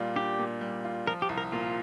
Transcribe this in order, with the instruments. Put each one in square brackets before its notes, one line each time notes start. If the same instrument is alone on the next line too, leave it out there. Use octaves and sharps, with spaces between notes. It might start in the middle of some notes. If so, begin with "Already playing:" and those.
Already playing: [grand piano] A#2 G3 F4
[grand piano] D4 [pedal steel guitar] G4
[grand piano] A#2
G3
F4
[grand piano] F3 [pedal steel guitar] A#4
[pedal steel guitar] G4
[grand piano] C2
[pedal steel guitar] A#4
[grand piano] A#2 [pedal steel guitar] F4